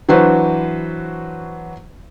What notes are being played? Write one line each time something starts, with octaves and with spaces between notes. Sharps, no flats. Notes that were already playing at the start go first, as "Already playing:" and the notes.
E3 F#3 D4 F#4 B4 C5